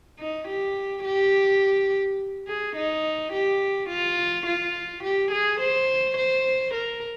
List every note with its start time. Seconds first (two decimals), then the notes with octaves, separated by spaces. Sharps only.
0.19 D#4
0.48 G4
1.05 G4
2.48 G#4
2.76 D#4
3.33 G4
3.89 F4
4.46 F4
5.04 G4
5.32 G#4
5.61 C5
6.17 C5
6.74 A#4